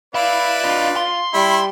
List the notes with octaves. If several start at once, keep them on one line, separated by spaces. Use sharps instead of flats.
B4 D5 E5 F5 B5
D4 F4 D#5
C6
G3 E4 B5